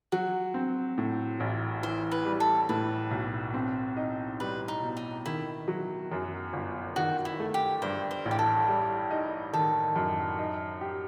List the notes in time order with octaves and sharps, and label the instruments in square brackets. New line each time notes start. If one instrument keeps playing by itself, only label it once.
[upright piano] F#3 [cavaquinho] F#4
[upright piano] C4
A2
A1
[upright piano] E3 [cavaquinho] C5
[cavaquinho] B4
[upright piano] G3
[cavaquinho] A4
[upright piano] A2 [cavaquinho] B4
[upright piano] B1
C4
D#4
[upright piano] G3 [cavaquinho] B4
[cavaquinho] D#4
[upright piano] B2
[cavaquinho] D#4
[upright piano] D#3 [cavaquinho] E4
[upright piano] F#3
F#2
G1
[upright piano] D#3 [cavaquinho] F#4
[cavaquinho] E4
[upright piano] A3
[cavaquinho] G4
[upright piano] G2 [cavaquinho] C5
[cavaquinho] C5
[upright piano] A1
[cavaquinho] G4
A4
[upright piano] G3
D#4
[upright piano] D#3 [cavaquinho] A4
[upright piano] F#2
D#4
G4